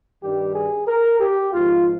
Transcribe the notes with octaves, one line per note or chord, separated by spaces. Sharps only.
G2 D#3 G3 G4
G#4
A#4
G4
G#1 G#2 F3 F4